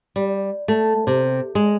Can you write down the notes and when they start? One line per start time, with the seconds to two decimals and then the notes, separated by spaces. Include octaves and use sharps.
0.16 G3
0.68 A3
1.07 C3
1.55 G#3